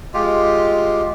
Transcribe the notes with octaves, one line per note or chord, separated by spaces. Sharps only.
G#3 F4 G4